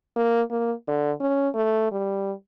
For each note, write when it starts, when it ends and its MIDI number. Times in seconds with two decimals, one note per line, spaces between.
0.17 0.42 58
0.51 0.73 58
0.88 1.12 50
1.21 1.49 61
1.55 1.88 57
1.92 2.32 55